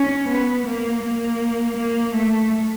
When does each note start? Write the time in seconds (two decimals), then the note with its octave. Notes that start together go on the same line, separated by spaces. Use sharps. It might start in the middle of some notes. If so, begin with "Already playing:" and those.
Already playing: C#4
0.29 B3
0.65 A#3
1.02 A#3
1.76 A#3
2.13 A3